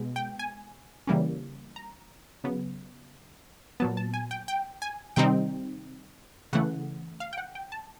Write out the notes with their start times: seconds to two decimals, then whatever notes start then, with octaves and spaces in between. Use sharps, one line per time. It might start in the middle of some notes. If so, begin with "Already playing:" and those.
Already playing: B2 G#3 B3
0.16 G5
0.39 G#5
1.07 C#3 E3 G3 A#3 C#4
1.76 A#5
2.44 C#3 F#3 B3
3.80 A#2 F#3 B3 A5
3.97 A5
4.14 G#5
4.31 G5
4.48 G5
4.82 G#5
5.16 C3 D#3 G3 C4 D#4 G5
6.53 C#3 E3 A3 F#5
7.20 F5
7.33 G5
7.38 F#5
7.55 G5
7.72 A5